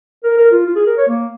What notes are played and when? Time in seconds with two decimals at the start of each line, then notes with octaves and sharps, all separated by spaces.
0.24 A#4
0.38 A#4
0.51 F4
0.66 F4
0.76 G#4
0.86 A#4
0.97 C#5
1.08 A#3